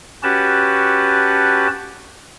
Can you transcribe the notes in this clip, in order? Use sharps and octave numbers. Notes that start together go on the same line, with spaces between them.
C#4 F#4 G4 B4 A5